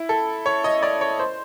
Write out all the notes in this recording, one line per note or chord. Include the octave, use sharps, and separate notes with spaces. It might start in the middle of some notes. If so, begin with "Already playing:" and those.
Already playing: E4
A4
C#5
D#5
D5
C#5
C5